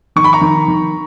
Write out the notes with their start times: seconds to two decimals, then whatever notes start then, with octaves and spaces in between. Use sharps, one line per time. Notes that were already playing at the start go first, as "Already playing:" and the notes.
0.16 D#3 C#6
0.24 B5
0.33 A#5 C#6
0.41 D#3
0.68 D#3